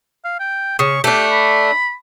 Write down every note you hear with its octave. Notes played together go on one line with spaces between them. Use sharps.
F5
G5
C#3 C#6
A3 D4 G4
B5